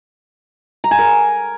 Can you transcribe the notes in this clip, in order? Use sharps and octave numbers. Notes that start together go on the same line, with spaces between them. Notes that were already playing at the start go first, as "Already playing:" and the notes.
A#5
G#5
A#4